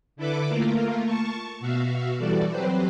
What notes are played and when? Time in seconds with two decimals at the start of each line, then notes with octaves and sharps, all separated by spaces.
0.16 D3 E4 A4 B4 D6
0.48 A3 A#3 F4 A#4
1.06 A5 C#6
1.60 B2 F#4 E5 F5
2.18 E3 G3 F#4 A4 D5
2.50 F#3 C4 G4 B4 C5